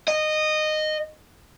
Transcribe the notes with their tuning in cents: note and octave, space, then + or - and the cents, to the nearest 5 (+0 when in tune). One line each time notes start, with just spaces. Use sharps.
D#5 -15